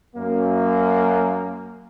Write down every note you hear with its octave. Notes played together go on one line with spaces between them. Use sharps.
F#2 A#3